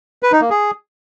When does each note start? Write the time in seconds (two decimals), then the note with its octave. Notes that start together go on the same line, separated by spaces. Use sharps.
0.23 B4
0.32 D#4
0.41 A#3
0.50 G#4